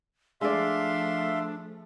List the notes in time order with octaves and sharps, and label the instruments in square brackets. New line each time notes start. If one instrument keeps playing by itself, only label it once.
[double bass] F3 A3 [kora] G#3 D5 [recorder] D4 [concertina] E5 F5 C6